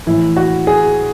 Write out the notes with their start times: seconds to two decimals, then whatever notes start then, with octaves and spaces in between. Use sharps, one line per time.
0.07 A2 E3 E4
0.37 F#4
0.67 G#4